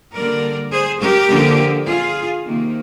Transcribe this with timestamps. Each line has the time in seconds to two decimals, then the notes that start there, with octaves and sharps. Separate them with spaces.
0.14 D3 G3 A#3 A#4 D5
0.72 G#4 C5
1.00 G4 A#4
1.29 D3 F3 A#3
1.86 F4 G#4
2.44 C3 D#3 A#3